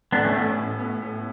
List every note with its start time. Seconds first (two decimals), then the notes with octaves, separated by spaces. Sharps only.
0.12 A2 B3 D4
0.24 A3 C#4
0.35 A1 B3
0.57 A1
0.79 B3
1.02 A2